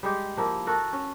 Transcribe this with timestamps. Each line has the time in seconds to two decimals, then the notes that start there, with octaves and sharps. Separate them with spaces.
0.03 G3 G#3 G4
0.37 F3 A#3 E4
0.67 F#4 A4 A#4
0.93 C#4